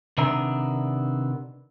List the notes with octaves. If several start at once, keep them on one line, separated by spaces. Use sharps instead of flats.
C3 D#3 B3 D4 E5 A#5